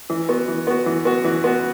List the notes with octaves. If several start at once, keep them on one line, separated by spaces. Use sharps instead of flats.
E3
B3 F#4
E3
B3 F#4
E3
B3 F#4
E3
B3 F#4